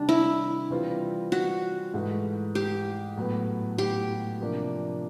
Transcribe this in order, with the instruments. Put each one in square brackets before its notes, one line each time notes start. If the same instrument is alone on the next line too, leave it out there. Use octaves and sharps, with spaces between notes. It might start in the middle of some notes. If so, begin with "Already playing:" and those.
Already playing: [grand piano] C3 D#3 G3 [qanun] D4
[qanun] E4
[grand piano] E3 G3 C4 F4
[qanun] F#4
[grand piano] G#2 E3 A3
[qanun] G4
[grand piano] A2 F#3 B3
[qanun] G4
[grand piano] C3 F3 A#3 D4